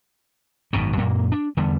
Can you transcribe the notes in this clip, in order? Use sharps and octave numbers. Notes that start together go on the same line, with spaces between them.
G#1 F#2 B2 D#3
F#2 A#2 A#3
D4
E2 D3 G3 B3